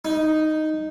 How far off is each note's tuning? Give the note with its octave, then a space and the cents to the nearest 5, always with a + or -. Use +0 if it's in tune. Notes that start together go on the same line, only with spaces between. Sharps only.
D#4 +0